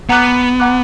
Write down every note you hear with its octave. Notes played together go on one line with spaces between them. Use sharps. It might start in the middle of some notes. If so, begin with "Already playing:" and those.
B3 F#5 A#5 D6 F#6
F#5 A#5 D6 F#6